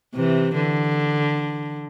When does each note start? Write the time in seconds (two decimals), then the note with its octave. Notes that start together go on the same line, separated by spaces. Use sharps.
0.15 C3 E3
0.55 D3